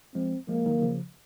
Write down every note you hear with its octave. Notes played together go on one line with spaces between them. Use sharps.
F3 G#3 C4
F3 G#3 A#3
D#3 F#3
D#3
C#3 F3